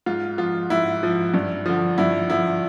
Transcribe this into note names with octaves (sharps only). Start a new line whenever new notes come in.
G#2 F4
F3 F4
G#2 E4
F3
G2
D3 F3
G2 E4
D3 F3 E4